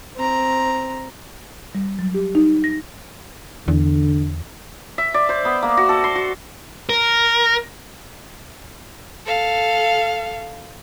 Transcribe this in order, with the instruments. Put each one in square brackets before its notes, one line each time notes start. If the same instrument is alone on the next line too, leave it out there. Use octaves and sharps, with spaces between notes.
[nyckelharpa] C4 A#5
[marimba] G3
F#3
G4
D#4
A#6
[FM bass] E2 [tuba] D3
[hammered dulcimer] E5
D5
C5
B3
A#3
F#4
A4
C6
F#4
[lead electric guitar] A#4
[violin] A4 F5